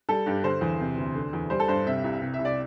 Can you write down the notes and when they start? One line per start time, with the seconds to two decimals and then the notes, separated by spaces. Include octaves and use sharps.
0.09 G3 A4
0.26 G2 G4
0.43 D3 C5
0.61 E2
0.80 C3
0.98 D2
1.15 D3
1.33 E2
1.50 G3 C5
1.60 A4
1.68 G2 C5
1.86 C3 E5
2.04 C2
2.21 C3
2.34 E5
2.39 C2
2.45 D5